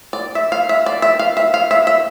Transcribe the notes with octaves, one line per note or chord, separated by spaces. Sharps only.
D5
E5
F5
E5
D5
E5
F5
E5
F5
E5
E5